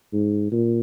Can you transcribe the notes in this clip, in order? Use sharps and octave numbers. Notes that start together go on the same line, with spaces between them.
G#2
A#2